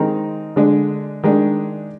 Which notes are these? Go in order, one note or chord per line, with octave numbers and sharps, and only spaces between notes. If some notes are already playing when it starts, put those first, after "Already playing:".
Already playing: D#3 G#3 C4 D#4
D3 G#3 D4
D#3 G#3 D4